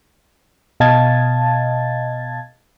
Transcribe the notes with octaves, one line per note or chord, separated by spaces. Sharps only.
B2 D#5 F5 A5 G#6 A6